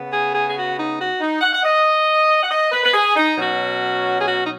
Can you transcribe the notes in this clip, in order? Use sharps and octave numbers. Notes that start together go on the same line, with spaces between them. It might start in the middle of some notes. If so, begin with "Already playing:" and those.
Already playing: C#3 B3
G#4
G#4
G#4
F#4
D#4
F#4
D#4
F#5
F#5
D#5
F#5
D#5
B4
B4
G#4
D#4
B2 F#3 C#4 F#4
G#4
F#4
D#4